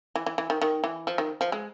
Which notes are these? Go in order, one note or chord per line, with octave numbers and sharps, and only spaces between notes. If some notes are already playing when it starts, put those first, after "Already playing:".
E3
E3
E3
D#3
D#3
E3
F3
D#3
F3
G#3